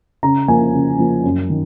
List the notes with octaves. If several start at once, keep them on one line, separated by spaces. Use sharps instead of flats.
C#3 A#5
F3 A#3 G#5
C#3
F3 A#3
F#2
D#3